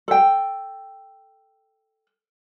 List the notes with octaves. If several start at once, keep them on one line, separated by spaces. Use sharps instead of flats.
A4 G5